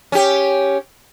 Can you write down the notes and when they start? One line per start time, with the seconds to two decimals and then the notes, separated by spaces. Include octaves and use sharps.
0.12 C#4 G4